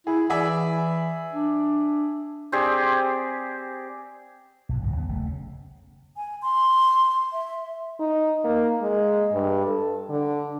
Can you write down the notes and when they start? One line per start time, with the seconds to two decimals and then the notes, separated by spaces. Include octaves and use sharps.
0.07 E4 G#4
0.30 E3 G#4 D5 E5
1.33 D4
2.52 C4 G4 G#4 D5
4.69 B1 G#2
4.81 G#1 C#2 F#2 F#3
4.96 D#2 G3 B3
5.09 F#1 A3
5.26 C#3
6.17 G#5
6.42 C6
7.32 E5
8.00 D#4
8.45 A#3
8.82 G#3
9.33 G2
9.67 A4
10.09 D3